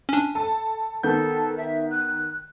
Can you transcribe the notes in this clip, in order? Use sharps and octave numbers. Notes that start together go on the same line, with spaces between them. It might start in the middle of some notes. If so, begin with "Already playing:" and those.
C#4 D4
A4 A5
D#3 B3 A4 G6
E5
F#6